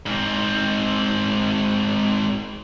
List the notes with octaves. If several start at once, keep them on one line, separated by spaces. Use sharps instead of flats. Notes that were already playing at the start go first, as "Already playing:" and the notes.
G#2 C4